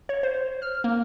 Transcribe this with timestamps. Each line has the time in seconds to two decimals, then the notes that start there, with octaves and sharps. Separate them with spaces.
0.09 C#5
0.23 C5
0.62 F6
0.84 A#3